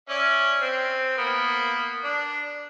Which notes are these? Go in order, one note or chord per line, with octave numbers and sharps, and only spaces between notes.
C#4 D5 E5
C4
A#3 B3
D4